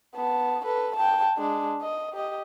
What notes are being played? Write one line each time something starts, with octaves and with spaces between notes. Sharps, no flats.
B3 A5
A4 B4
G5 A5
G#3 D4
D#5
G4 D#5